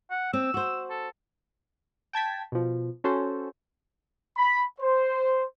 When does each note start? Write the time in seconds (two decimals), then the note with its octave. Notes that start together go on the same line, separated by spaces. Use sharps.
0.11 F#5
0.33 C4 E6
0.54 F#4 C5
0.90 A4
2.13 G5 A5 G#6 B6
2.52 B2 F3
3.04 C#4 F#4 A4 C5
4.37 B5
4.80 C5